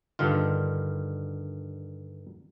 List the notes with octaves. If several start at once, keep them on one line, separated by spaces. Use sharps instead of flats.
G2 D3 D#3 F4